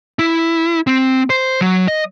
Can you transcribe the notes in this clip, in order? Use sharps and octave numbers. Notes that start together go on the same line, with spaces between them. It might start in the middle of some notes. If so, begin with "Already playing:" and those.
E4
C4
C5
F#3
D#5